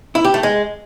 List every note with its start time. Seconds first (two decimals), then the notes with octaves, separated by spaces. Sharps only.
0.15 E4
0.24 G4
0.34 A3
0.43 G#3